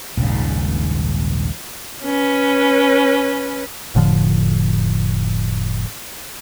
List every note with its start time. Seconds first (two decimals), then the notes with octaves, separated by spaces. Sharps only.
0.17 D#1 A#1 G#2 C#3
2.04 C#4 B4
3.95 F1 A2 D3 F3